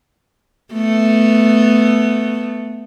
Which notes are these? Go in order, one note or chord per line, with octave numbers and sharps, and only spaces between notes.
A3 B3